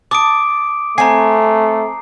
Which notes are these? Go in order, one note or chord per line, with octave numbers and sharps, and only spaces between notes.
A5 D6 D#6 D7
A3 C4 G#5 A#5 C7